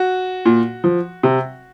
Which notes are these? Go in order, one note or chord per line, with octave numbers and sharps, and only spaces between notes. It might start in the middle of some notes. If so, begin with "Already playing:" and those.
Already playing: F#4
A#2
F3
C3